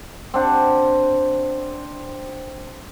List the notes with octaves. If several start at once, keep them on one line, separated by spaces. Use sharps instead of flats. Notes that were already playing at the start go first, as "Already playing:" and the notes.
C4 D4 F#5